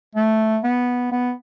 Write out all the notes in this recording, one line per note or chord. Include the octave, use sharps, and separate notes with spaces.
A3
B3
B3